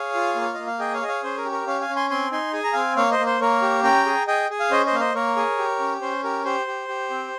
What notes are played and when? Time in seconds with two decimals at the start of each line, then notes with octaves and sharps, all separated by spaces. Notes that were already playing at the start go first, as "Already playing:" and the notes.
Already playing: G#4 C#5 F5
0.14 F4
0.36 A#3
0.41 C#5
0.54 A#3 D#5
0.67 F5
0.79 G#4 D#5 G5
0.94 C#5 F5
1.01 G#4 D#5
1.08 C#5 F5
1.23 C#4 C5
1.37 A#4
1.45 G4
1.52 A#4 C#5
1.67 C#4 C#5 F5
1.81 F5 G#5
1.89 C#4
1.96 G#5 C6
2.10 C4 G#5 C6
2.32 D#4 G#5 C6
2.53 G#4 G#5
2.64 A#5
2.73 C4 F5 G#5
2.96 A#3 C#5 F5
3.11 C5 D#5
3.18 A#3
3.26 C5
3.40 A#3 A#4 C#5
3.62 G4
3.84 C#4 G5 A#5
4.06 G#4
4.27 G#4 D#5 G5
4.50 G#4
4.60 F5
4.71 C#4 C5 D#5
4.85 C5 D#5
4.92 A#3 F5
5.00 C5 D#5
5.14 A#3 A#4 C#5
5.36 G#4
5.58 G4
5.79 C#4
6.01 C#4 C5
6.24 G4 A#4
6.45 G4 C5
6.67 G4
6.88 G4
7.10 C4